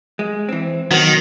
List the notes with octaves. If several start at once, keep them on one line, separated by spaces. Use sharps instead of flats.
G#3
E3 C4
D#3 F#3 B3 F#4